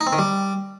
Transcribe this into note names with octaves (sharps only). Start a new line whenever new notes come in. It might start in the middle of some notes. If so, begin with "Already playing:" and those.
D#4
C4
D#3
G3